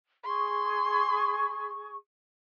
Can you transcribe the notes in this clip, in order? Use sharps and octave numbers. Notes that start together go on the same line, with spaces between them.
G#4 C6 C#6